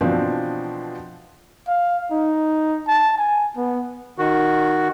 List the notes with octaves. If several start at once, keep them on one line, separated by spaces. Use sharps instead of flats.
B2 E3 F3 C4 D4
F5
D#4
A5
G#5
B3
D#3 F#4